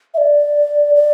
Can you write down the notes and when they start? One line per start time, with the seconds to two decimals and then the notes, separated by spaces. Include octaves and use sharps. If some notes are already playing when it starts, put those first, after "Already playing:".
0.14 E5
0.18 D5
0.95 D5